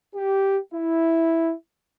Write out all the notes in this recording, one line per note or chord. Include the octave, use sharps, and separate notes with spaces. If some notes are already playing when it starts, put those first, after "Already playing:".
G4
E4